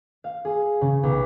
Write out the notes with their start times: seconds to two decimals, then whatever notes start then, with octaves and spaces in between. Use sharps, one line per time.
0.24 F5
0.45 G#4
0.81 C#3
1.03 B1